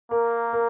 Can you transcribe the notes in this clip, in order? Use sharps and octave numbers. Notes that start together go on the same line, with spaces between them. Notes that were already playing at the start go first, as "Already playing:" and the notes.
A#3 A#4
A#4